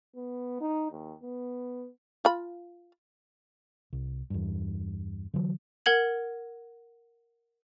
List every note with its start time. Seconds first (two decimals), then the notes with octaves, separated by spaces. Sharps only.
0.16 B3
0.61 D#4
0.91 D#2
1.23 B3
2.25 F4 B5
3.93 C2
4.30 E2 G2
5.34 D3 E3 F#3
5.86 A#4 F#5 G#6 F#7